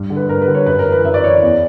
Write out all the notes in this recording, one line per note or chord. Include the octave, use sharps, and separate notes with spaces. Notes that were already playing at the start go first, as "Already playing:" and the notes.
Already playing: G2
D3
B4
G2 A#4
B4
D3
C#5
F#2 B4
A#4
E3
B4
F#2 E5
D5
E3 C#5
D5
E2